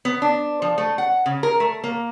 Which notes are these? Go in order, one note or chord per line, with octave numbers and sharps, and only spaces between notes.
B3
D4
F3
A3
F#5
C#3
A#4
A3
A#3